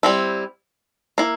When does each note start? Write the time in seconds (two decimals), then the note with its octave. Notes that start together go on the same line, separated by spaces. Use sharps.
0.03 G3 C4 E4
1.18 A#3 E4